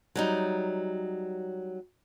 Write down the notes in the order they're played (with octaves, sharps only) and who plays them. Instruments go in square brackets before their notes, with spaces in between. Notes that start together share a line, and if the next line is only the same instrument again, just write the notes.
[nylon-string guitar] F#3 G3 D#4